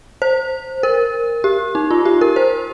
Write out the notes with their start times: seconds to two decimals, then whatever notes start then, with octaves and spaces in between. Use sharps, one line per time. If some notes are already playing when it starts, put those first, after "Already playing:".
0.22 C5
0.83 A#4
1.44 G4
1.75 D#4
1.91 F4
2.05 G4
2.21 A#4
2.36 C5